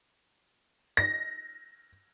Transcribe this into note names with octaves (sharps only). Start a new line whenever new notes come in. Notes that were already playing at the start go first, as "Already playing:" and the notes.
A#6